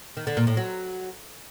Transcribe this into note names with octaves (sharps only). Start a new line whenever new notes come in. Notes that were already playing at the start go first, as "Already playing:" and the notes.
D#3
D3
A#2
A2
F#3